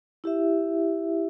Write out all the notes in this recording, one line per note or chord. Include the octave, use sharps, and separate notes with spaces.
E4 G4 E5